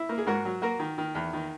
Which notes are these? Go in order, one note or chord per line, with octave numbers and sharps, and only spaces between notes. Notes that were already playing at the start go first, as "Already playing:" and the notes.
Already playing: E4
A#3
G#4
G#2 F#4 A#4
F#3
A#3 F#4 A#4
D#3
D#3
E2
D#3